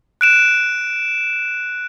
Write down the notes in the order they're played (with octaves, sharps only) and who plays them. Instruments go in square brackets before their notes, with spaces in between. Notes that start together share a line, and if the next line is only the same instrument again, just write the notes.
[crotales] F#6 D7 E7